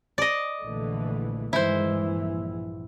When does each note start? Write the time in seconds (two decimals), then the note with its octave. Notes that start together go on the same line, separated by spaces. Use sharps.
0.18 D5 D#5
0.63 A#1 D3 E3 A3
1.53 G2 D#3 E3 G#3 E4 C5
1.97 A#1